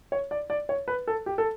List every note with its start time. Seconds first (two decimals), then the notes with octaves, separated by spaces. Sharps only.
0.12 C#5
0.31 D5
0.50 D5
0.69 C#5
0.88 B4
1.08 A4
1.26 G4
1.38 A4